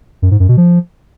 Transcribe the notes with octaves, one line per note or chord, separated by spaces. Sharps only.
F#2
G#2
F#2
B2
F3